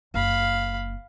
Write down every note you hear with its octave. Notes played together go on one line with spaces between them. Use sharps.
F#1 F5 B5